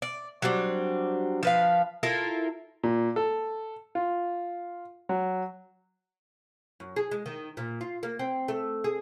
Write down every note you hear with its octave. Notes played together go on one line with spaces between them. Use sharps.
D5
F#3 G3 C4 D4
F3 B4 F5
E4 F4 A4 A#4
A#2
A4
F4
F#3
F#2
G#4
G#3
D#3
A#2
F4
A#3
C4
A3
G#4